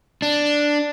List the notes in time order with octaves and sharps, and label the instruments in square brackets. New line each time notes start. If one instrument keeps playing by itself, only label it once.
[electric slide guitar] D4